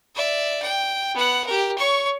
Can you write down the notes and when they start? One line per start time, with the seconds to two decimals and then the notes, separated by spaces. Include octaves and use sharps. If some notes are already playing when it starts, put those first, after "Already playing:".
0.15 D5 E5
0.62 G5
1.15 B3 F#5
1.47 G4 A#4
1.78 C#5 C#6